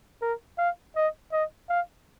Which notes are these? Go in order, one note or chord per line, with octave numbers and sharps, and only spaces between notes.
A#4
F5
D#5
D#5
F5